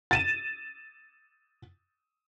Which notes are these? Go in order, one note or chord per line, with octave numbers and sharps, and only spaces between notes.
A6 D#7 E7